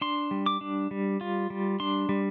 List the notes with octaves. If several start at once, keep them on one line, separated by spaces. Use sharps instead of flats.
D4 C6
G3
D6
D4
G3
F4
G3
D4 C6
G3